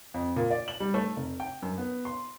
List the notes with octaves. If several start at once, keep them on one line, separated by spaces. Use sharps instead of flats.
F2
A#2
D5
F#7
G3
A3
F1
G5
F#2
B3
C6